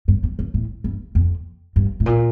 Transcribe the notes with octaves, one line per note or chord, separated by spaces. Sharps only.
G2
G2
G2
A2
G2
F2
G2
A2
A#2